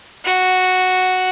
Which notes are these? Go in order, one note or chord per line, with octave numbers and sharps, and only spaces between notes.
F#4